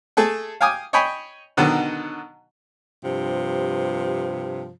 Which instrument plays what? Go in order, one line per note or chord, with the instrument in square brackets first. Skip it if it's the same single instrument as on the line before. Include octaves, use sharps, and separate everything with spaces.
[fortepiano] A3 G#4 A4
F5 G5 G#5 D6 D#6
C#5 D#5 G5 G#5 B5
B2 D3 D#3 F#3 B3
[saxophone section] G2 C3 F3